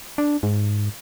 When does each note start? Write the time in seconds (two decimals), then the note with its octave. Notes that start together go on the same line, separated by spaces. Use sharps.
0.18 D4
0.43 G#2